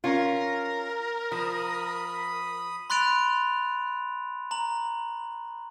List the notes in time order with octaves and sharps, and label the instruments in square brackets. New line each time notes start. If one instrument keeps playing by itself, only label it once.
[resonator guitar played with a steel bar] C#4 F4 [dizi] A#4
[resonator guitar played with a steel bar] F3 [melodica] B5 D#6
[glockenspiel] B5 C6 F#6 A6 D7 F7
A#5 F#7